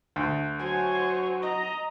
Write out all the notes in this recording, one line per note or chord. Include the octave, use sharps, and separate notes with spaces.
D2
F#3 C5 C#5 G#5
D#5 A#5